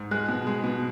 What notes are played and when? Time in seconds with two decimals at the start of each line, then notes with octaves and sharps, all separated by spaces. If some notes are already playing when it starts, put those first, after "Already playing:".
Already playing: G#2
0.11 G#3 F#6
0.29 B2
0.47 G#3
0.64 B2